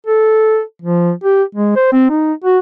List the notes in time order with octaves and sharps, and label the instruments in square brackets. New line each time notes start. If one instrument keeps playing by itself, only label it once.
[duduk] A4
F3
G4
G#3
C5
C4
D#4
F#4